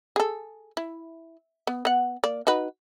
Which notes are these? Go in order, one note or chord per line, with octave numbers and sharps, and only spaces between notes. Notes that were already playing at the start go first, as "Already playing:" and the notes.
G#4 A4
E4
B3
B3 F#5
A#3 D5
D#4 F#4 B4